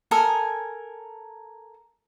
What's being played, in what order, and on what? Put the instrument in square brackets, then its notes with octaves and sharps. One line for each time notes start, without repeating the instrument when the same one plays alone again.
[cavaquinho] A4 A#4 G#5 D#6